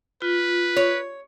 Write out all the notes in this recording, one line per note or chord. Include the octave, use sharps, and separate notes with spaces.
F4 B4
C#5